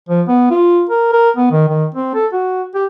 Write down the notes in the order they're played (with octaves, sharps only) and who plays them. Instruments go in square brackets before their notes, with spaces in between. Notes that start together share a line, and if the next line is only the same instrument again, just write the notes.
[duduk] F3
B3
F4
A#4
A#4
B3
D#3
D#3
C4
A4
F#4
G4